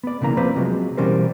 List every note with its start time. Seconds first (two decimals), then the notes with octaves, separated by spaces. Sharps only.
0.04 B3 D5
0.21 B1 C#3 E3 A#3 A#5
0.37 F3 A#3 C4 B4 C5 D5
0.56 C3 F3 F#3 G#3
0.97 B2 E3 G3 C#4 A#4 C5